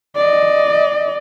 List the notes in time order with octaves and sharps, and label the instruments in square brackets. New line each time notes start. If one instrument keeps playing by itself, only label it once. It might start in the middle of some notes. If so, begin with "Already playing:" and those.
[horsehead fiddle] D5 D#5